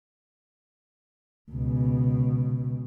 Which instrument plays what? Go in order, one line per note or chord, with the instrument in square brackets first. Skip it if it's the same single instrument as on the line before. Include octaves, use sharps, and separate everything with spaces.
[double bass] C#2 B2